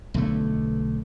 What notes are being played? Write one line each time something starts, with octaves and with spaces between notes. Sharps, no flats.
B1 D3 A3